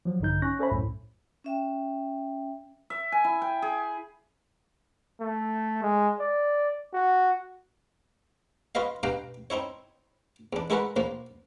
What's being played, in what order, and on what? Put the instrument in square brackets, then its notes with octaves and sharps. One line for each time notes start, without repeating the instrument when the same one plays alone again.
[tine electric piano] F3 F#3
A#1 G2 D3 D#4 G6
C#4 C#6 F#6 A#6
C#4 A4 C5 C#5 E5 B5
C2 F#2 A2
[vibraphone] C#4 E5 G5
[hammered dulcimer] E5
G#5
E4
G5
G#4
[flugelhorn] A3
G#3
D5
F#4
[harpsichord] F4 F#4 B4 D#5 F5
G2 B2 F5 G5 A#5
C4 D#4 E4 C#5
E2 D4
G#3 E4 F#4 A#4 B4 F#5
A#1 F3 A#3